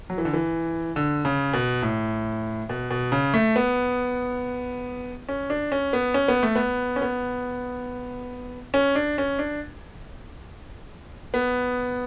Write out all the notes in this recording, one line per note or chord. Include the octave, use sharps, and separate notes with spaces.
F#3
E3
D3
E3
D3
C#3
B2
A2
B2
B2
C#3
A3
B3
C#4
D4
C#4
B3
C#4
B3
A3
B3
C#4
B3
C#4
D4
C#4
D4
B3